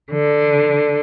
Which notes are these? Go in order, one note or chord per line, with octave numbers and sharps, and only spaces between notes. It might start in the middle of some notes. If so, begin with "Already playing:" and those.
D3